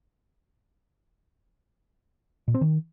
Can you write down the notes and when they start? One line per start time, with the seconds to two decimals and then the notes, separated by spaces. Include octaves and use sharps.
2.48 A#2
2.54 C4
2.61 D#3